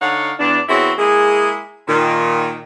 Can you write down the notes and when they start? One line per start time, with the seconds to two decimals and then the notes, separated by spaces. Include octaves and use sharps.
0.01 D3 D#4 C#5 F5 F#5
0.39 E2 D4
0.69 E2 C4 E4 F#4 G#4 C#5
0.98 G#3 A#3 E4 G#4
1.88 A#2 D#3